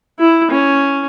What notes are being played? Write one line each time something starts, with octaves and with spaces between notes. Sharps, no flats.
E4
C#4